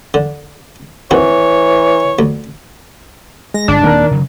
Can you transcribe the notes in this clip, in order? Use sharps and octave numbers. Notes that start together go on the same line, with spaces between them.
D3
D#3 E3 C4 F#4 C#5
D2
G#3 A#6
G1 D4
D#1 D#3 A#3 C4 A#4
C#3 F#3